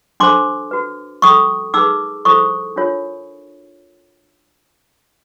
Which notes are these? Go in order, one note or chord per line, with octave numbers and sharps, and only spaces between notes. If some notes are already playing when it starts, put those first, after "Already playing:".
D4 F#4 A4 C5 C6 D6
F#4 B4
C#4 F#4 A4 C#6 D#6
D#4 G#4 B4 D6 E6
E4 A4 C5 C#6 D#6
D4 F4 A#4 C#5